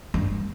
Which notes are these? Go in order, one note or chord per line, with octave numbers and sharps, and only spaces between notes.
G2